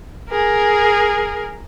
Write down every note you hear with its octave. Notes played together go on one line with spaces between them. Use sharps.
G#4 A#4